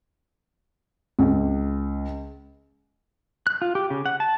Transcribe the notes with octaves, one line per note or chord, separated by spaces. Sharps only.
C#2
F#6
F4
G4
C#3
F#5
A5